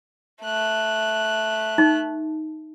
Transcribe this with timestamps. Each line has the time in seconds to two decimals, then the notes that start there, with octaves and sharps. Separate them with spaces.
0.43 A3 F#6
1.78 D#4